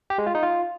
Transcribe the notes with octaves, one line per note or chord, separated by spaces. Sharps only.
G4
G#3
F4
D#4
F4